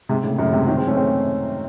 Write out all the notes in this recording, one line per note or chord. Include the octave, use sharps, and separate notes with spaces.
G#2 C3
A2 C#3
F#2 A2
G#2 C3
D#3 F#3
G#3 C4
A3 C#4
G#3 C4